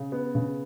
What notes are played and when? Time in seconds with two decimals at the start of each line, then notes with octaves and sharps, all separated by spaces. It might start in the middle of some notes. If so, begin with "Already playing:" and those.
Already playing: C#3
0.12 B3
0.35 C#3